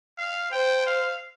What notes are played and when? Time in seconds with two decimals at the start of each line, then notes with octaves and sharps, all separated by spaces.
0.18 F5
0.52 C5 G5
0.86 F5